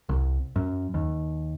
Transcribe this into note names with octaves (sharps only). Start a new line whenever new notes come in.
C2
F#2
D#2